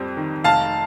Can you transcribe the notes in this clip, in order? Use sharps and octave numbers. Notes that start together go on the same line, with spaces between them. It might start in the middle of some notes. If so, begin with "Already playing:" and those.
Already playing: F2 G3 C4
D#3
F1 F5 A5